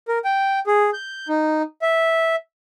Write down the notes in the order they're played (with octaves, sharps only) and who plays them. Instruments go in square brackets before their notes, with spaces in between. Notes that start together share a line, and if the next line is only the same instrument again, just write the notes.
[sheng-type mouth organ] A#4
G5
G#4
G6
D#4
E5